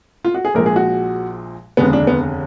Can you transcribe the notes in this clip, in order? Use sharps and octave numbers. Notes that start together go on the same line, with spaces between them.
F4
F#4
G#4
A#1 A#2 F3 G#3 A#4
G#4
F#4
F1 D#2 D3 G#3 B3
D4
B3